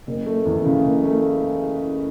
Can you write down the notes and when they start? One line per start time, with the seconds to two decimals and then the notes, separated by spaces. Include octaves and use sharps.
0.07 F#1
0.26 A3
0.45 E2
0.64 C#3
0.84 F#1
1.03 A3